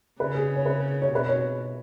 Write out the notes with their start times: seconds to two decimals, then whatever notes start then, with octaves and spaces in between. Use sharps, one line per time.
0.20 C#3 B4
0.35 G#4
0.56 C#5
0.66 B4
1.02 C#5
1.12 B2 B4
1.29 C#5